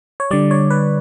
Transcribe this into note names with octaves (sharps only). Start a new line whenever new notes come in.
C#5
D3 G3 D5
C#5
B4